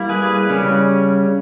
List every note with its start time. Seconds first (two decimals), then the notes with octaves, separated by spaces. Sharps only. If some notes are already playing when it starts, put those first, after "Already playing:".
Already playing: G3 A#3 E4
0.09 G#4 B4
0.49 C#3 G3 C#4